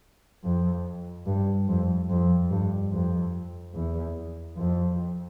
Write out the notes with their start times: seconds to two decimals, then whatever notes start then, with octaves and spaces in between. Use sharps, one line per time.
0.43 F2
1.26 G2
1.68 F2
2.09 F2
2.50 G2
2.92 F2
3.74 E2
4.57 F2